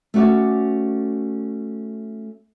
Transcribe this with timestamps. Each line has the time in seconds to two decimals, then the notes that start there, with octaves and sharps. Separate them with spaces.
0.14 A3 C#4 F#4 D5